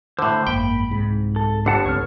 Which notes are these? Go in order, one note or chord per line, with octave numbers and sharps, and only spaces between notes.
A2 D3 C5
G#1 F#2 A#3 G5 B5
C2 G#2 C3
A4
G1 D3 F#5 A5
C#2 C4 C#5 F6